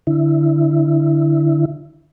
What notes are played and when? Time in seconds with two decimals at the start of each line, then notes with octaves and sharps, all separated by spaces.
0.07 D3 E4